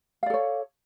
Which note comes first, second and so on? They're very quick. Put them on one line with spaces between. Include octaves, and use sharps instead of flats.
F5 D5 A4 C#5